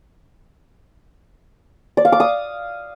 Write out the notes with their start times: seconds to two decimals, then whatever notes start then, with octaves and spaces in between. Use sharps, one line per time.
1.97 D5
2.05 F5
2.12 D6
2.20 D#6